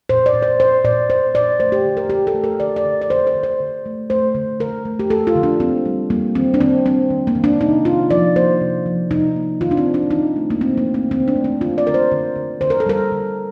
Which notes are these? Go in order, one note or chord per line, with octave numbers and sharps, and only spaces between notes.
A#2 C5
D5
A#2
C5
A#2 C5
A#2 D5
A#2 C5
A#2 D5
A3 C5
G4
D3
A#4
D3 G4
A4
A3
A#4
D3 D5
D5
D3
D5
D3 C5
C5
D3
C5
D3
A3
A3 C5
D3
D3 A#4
A3
G4
A3 A4
F4
D3
D4
A#3 C4
G3
G3 A#3
D#3 C4
D4
D#3 C4
G3 C4
D#3
A#3
D#3
D4
C3 D#4
C3 F4
F3 D5
A#3 C5
C3
F3
C3 D#4
A#3
D#3 F4
D4
C4
D#3
D4
D#3 D#4
A3
A#3
A3 C4
A#3
A3
C4
D#3 C4
D4
A3
D4
D3 F4
D5
D3 A#4
C5
D3
D3
D3 C5
A#4
A4
G3 A#4
D3